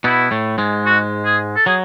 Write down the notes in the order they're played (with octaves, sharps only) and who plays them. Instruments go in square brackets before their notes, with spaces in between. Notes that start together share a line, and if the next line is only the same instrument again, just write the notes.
[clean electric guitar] B2 B3 [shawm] E4
[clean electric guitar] A2 A3
G#2 G#3
[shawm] F#4
G#4
A4
[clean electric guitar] F#3 [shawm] G#4